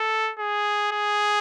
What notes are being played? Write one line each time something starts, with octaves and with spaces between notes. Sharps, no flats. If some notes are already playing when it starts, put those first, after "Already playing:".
Already playing: A4
G#4
G#4